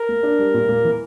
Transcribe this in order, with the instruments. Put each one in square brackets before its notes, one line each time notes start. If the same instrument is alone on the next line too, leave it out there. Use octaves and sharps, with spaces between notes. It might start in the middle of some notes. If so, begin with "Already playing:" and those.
Already playing: [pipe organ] A#4
[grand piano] A#3
D4
G3
A#2
A#3
E3